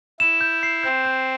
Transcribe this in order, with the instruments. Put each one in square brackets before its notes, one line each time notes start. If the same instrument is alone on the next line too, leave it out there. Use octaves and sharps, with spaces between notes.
[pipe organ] E4 [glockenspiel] E7
[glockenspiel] G6
C7
[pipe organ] C4 [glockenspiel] G6
[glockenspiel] G6